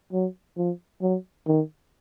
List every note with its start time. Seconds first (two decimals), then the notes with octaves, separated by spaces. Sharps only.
0.13 F#3
0.57 F3
1.02 F#3
1.47 D#3